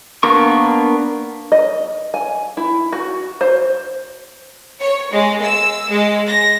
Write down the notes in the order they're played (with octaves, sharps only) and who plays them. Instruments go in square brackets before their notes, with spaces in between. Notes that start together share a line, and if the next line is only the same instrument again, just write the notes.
[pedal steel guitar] A#3 B3 D4 A#4 C#6
[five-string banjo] D#5
G#5
E4
F#4
C5
[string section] C#5
G#3
E6
G#3
A#6